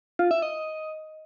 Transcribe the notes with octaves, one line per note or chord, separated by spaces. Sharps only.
F4
E5
D#5